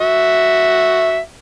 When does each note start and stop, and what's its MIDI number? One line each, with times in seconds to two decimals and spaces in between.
0.01 1.18 66
0.01 1.18 76